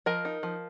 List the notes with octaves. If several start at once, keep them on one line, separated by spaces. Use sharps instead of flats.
F3 A#4 D#5
D#4
F3